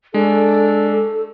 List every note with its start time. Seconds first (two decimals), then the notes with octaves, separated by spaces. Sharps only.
0.14 G#3 D4 A4